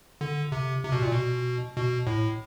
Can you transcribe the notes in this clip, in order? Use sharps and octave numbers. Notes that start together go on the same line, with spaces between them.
D3
C3
C3
B2
A#2
B2
B2
A2